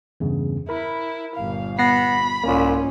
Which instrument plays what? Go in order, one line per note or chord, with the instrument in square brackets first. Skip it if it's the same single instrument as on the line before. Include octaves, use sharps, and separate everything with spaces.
[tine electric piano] E2 G2 C#3
[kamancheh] E4 [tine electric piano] A#4 B5
[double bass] G1 A#2 [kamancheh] F5
[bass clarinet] B3 [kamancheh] B5 [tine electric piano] A#6 C7
[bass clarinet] C2 [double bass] G#2 C#4 [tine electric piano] A#3 F4